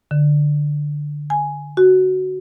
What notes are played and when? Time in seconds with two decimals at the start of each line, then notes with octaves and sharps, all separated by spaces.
0.11 D3
1.30 G#5
1.77 F#4